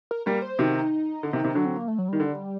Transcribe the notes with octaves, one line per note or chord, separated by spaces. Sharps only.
A#4
G3 A#3 A#4
C5
C3 D#3 F#4
D#4
D3
C3 D#3
C3 D#3
D3 F#3 D4
C4
A#3
A3
F#3
D#3 G3
D3